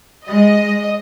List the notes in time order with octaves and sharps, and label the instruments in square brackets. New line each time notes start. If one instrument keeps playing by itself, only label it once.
[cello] G#3 [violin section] D#5